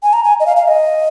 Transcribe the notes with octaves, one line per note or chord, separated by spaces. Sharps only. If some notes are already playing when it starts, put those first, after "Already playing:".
G#5
A#5
G#5
D#5
F5
F5
D#5